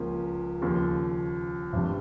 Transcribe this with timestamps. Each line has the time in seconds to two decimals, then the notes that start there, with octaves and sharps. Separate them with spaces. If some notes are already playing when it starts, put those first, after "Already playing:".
Already playing: C#2 C#3 F3 A#3 C#4
0.62 D#2 C#3 F3
1.73 G#1 G2 G3